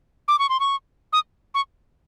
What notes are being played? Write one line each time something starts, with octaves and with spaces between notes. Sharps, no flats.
D6
C#6
C6
C#6
D#6
C#6